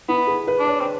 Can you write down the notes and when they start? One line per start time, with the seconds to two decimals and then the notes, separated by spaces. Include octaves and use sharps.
0.09 B3 E4
0.27 G#4
0.47 B4
0.59 D4
0.66 C#5
0.80 C4